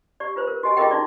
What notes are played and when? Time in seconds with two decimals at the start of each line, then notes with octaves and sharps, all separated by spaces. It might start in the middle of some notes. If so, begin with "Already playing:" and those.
0.20 G4 D5
0.36 F4 B4 C5
0.47 A#4
0.63 F#4 G4 D#5 G#5
0.77 F4 G#4 A#4 D#5 G5
0.91 D#4 E4 F#4 D5